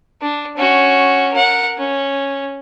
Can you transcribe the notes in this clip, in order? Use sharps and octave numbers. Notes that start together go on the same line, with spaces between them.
D4
C#4 F#4
A#4 F#5
C#4